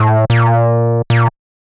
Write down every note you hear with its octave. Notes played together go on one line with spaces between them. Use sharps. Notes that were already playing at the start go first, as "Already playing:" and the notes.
Already playing: A2
A#2
A#2